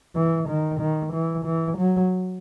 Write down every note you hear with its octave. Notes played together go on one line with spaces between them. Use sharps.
E3
D#3
D#3
E3
E3
F#3